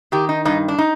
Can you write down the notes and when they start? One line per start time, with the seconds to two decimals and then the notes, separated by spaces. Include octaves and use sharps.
0.12 D#3 G4
0.29 D#4
0.45 G2 D#4
0.68 D4
0.78 D#4